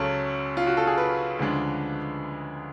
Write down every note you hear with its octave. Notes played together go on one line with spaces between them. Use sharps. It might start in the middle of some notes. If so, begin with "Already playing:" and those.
Already playing: C#2 C#3 F#3 C#4 A4
F4
F#4
A4
G#4
B4
D2 C#3 F3 G#3 D4